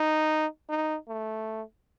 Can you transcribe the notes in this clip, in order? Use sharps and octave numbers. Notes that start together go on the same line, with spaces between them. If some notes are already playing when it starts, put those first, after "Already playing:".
Already playing: D#4
D#4
A3